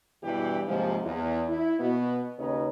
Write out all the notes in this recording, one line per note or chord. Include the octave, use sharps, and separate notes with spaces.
E2 G2 B2 E3 G4
D#2 G#2 C3 F3
E2
E4
B2 B3
D#2 C#3 D#4 B4 C#5